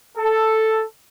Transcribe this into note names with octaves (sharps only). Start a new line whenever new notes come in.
A4